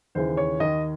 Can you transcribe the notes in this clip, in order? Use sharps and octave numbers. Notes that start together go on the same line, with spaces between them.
D#2 C#3 E3 C5
C#5
D#2 D#3 D#5